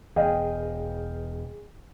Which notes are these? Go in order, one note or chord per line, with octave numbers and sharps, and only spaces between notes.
E1 E2 G#4 D#5 F5 G5